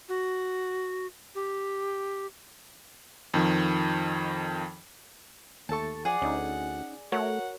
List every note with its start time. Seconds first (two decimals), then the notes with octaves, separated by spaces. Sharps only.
0.09 F#4
1.35 G4
3.34 F2 D#3 F3
5.69 D#2 A3 A4 A5 C#6
6.05 F3 G#4 D5 F#5
6.22 D2 C#4 D#4
7.12 A3 F#4 A#4 C#5 F#5